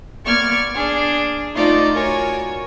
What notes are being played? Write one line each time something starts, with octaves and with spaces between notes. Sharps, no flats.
A#3 B3 D5 C#6 F6 G#6
D4 G#4
A3 D#4 F4 C5 D5 D#5
F#4 A#4 C#5 G#5